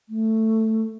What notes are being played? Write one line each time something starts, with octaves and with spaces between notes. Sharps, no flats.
A3